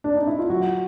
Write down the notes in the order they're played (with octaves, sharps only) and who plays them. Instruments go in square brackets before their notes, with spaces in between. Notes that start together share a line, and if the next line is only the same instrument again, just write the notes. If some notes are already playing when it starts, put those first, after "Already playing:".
[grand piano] D4
D#4
E4
F4
F#3 F#4